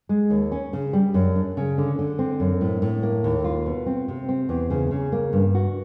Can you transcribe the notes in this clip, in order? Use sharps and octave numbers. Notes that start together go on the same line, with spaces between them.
G#3
D#2
C#4
C#3
G3
F#2
D4
C#3
D3
D3
C4
F#2
A2
A2
A#3
D#2
F4
B2
C4
C3
C4
E2
C#3
C#3
A#3
G2
F#4